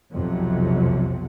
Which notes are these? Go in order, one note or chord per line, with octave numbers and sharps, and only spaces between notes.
B1 F2 C3 F#3